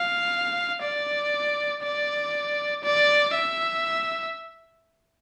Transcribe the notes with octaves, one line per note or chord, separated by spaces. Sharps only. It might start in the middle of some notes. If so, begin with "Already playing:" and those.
Already playing: F5
D5
D5
D5
E5